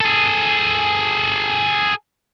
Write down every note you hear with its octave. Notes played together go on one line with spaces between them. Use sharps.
G#4 A4